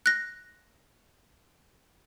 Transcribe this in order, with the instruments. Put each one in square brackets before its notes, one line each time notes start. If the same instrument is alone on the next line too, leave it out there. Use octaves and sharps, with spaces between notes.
[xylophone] F#6 A#6